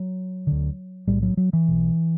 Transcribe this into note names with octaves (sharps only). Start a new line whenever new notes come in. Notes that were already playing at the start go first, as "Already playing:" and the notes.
Already playing: F#3
D2 D3
B1 A2 G3
F#3
F#3
E3
B1 B2